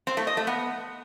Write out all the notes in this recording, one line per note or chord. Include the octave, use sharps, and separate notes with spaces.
C4
A3
D#5
A3
B3